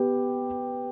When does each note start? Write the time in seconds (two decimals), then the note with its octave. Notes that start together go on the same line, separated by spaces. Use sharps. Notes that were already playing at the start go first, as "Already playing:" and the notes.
Already playing: B3 G4 B4